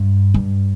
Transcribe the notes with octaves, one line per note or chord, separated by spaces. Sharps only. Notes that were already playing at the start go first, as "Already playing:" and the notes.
Already playing: G2
G2